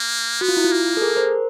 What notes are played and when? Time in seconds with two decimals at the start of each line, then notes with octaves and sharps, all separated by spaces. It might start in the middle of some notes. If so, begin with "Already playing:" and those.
Already playing: A#3
0.41 B3 F#4
0.48 F4
0.57 E4
0.65 F4
0.72 A#3
0.97 A4
1.02 G#4 A#4
1.17 A#4 C5